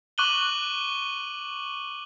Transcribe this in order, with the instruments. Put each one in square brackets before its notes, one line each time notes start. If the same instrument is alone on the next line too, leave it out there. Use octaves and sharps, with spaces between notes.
[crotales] C#6 D6 F#6 D#7 F#7 G7